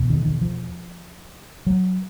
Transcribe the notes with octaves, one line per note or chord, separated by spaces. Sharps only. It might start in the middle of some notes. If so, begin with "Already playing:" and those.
Already playing: E2 B2
D#3
D#3
F3
F#3